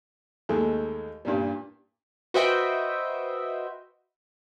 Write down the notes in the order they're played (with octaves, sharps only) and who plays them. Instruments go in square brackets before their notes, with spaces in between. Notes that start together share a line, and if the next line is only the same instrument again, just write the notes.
[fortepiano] D#2 G#3 A3
G2 A#2 G3
[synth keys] F#4 B4 C5 D#5 E5 G5